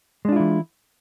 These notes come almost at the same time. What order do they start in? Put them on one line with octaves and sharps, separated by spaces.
G#3 D4 F4 E4 E3